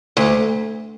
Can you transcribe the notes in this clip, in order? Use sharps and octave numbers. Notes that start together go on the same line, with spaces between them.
D2